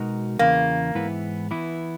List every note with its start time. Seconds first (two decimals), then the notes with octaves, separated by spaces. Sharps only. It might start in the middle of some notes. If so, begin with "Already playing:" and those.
Already playing: B2 G#3 D#4 F#4 A#4
0.39 E2 C#3 E3 A#3
0.95 G#2 E3 B3 E4 B4
1.51 E3 B3 E4